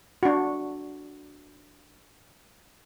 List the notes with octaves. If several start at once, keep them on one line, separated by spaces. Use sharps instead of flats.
D4 F#4